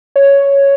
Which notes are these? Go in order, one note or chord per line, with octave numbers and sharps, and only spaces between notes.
C#5